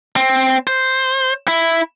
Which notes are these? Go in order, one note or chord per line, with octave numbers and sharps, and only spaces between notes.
C4
C5
E4